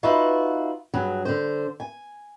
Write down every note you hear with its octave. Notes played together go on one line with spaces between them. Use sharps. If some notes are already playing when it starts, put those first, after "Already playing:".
D#4 F4 F#4 B4 E5
G2 F#3 G#4
D3 C5
G#5